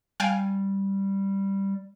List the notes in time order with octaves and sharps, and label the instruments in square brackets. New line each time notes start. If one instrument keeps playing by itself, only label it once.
[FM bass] G3 [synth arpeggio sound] F5 G5 G#5